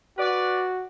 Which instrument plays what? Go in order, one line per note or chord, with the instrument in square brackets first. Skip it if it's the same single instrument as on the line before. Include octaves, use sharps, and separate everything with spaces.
[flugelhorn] F#4 [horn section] B4 D5